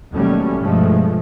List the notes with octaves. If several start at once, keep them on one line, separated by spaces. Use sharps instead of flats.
D#2 B2 F#3 G3 A3 C#4
G2 B2 F3 G#3 A3